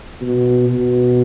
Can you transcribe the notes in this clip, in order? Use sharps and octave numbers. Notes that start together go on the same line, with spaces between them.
B2
B2